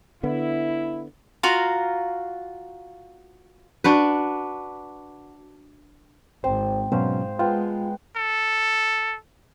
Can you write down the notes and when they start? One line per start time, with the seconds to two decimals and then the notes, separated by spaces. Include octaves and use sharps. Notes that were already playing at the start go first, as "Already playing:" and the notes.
0.23 D3 B3 E4
1.43 F4 F#4 F5 A#5
3.84 D4 F#4 B4
6.44 G#1 C4 C5
6.92 G#2 B2 F#3 C#4 C5 F5
7.39 G#3 B3 F4 G5 A5
8.17 A4